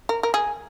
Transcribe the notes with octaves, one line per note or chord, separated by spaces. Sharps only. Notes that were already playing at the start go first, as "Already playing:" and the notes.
A#4
A#4
G#4